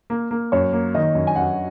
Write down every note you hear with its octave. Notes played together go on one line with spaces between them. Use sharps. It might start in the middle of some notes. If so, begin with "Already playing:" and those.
A#3
A#3
F#2 C#5
A#3
D#3 D#5
F#2
G#5
F#2 F#5